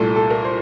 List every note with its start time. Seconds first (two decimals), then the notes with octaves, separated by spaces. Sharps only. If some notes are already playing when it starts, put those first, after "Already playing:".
Already playing: C2 A#2 A3 A4
0.16 A4
0.30 A#4
0.44 C5